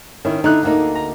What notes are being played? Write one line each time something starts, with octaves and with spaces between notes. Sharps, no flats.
D#3 C#4 E4
D3 D#4 E4 F#6
D2 A#3 D#4
A#5